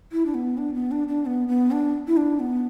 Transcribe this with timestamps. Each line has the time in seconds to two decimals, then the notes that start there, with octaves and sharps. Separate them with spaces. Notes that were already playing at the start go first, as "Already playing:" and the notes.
0.12 E4
0.26 D4
0.34 B3
0.58 D4
0.75 B3
0.91 D4
1.08 D4
1.26 B3
1.48 B3
1.71 D4
2.08 E4
2.17 D4
2.40 B3